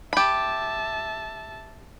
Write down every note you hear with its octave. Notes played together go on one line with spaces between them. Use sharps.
G4 E5 A5 B5